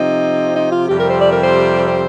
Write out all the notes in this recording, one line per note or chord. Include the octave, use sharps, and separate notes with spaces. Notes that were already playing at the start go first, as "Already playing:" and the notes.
Already playing: C3 F3 C4 D#4
D#4
F4
F2 C3 G3 C4 G4
A#4
C5
D5
A#4
C5
C5